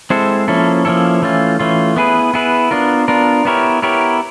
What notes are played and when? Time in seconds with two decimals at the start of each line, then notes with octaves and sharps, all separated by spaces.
0.10 G#3 C4 E4 A4 C5
0.48 F3 A#3 C#4 E4 A4
0.85 F3 A#3 C#4 E4 A4
1.22 E3 A3 C#4 F4
1.59 E3 A3 C#4 F4
1.96 B3 E4 G#4 B4
2.34 B3 E4 G#4 B4
2.71 B3 D4 F4 A#4
3.08 B3 D4 F4 A#4
3.45 B3 E4 G4 A#4 C#5
3.82 B3 E4 G4 A#4 C#5